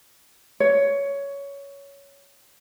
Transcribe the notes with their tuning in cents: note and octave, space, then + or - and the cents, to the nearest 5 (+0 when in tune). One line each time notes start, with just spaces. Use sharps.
C#5 +15